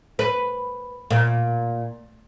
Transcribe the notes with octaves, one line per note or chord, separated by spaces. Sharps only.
B4
A#2